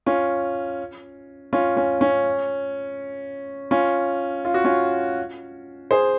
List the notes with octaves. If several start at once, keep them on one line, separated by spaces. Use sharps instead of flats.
C#4 F4
C#4 F4
C#4
C#4
C#4 F4
F4
F#4
C#4 F4
G#4 C5